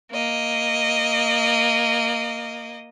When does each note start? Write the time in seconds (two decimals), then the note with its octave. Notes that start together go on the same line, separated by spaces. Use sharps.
0.12 A#3 D#5